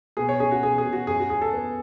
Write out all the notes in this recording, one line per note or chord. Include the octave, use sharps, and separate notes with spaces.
B2 G#4
C#5
C#4 G#4
F#4
B2 G#4
G#4
B2
F#4
F#2 G#4
F#4
F#2 G#4
A4
B3